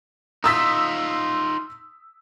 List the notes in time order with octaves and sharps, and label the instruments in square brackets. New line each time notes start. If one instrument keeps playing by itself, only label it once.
[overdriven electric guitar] D#4 F4 [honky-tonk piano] D#6 E6 B6